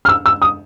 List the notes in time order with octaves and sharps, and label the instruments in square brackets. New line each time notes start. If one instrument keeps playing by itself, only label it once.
[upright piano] F6
E6
E6
D#6